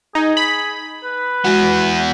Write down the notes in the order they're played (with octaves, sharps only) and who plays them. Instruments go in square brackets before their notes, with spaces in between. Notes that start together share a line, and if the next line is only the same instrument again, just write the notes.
[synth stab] D#4 [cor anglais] G#4
[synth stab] B5
[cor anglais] B4
[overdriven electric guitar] E3 B3 [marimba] G#3 F#4